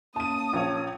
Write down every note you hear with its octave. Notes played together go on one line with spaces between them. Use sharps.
A#3 C#4 A5 D#6 D#7
A#1 C#5